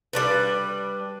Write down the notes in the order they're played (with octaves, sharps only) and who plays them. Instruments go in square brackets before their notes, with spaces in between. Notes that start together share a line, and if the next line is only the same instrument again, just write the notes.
[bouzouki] G3 D4 B4